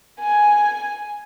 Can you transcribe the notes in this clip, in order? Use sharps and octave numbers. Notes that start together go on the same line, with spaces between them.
G#5